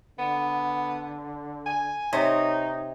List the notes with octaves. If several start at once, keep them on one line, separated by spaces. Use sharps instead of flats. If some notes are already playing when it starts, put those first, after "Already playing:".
D3 B3
G#5
C3 D#4 C#5